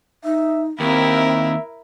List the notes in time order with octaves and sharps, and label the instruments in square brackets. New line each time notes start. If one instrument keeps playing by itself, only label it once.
[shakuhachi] D#4 [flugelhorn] E5
[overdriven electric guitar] D#2 [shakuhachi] C4 [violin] E4 A#4 [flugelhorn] E5